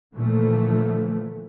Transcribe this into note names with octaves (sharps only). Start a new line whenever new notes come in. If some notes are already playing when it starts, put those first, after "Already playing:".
A#2 D3 E3 F3 A3